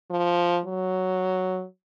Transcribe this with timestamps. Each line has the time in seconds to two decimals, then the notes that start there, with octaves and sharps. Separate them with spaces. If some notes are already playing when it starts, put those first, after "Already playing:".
0.10 F3
0.66 F#3